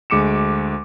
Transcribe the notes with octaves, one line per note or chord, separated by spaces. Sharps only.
D2 G#3 D6 C#7 E7